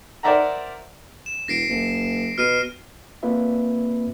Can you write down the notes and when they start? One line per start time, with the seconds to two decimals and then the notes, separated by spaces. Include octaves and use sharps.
0.23 A#4 C5 D5 E5 F#5 A#5
1.26 E7
1.48 E1 A#6 C7 D7
1.69 F#1
2.38 B2 F6 C7 D#7
3.23 A#3 C4 F4 B4 E5